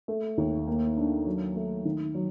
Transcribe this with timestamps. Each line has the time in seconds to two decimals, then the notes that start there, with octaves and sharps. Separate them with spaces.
0.08 A3
0.38 D#2
0.67 A#3
0.97 D4
1.26 F#3
1.56 A3
1.85 D#3
2.15 F#3